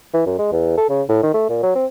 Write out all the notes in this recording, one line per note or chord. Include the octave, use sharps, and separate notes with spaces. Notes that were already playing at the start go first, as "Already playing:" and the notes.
E3
F#2
G#3
E2
A4
C#3
A2
D#3
A3
A#2
F#3
C4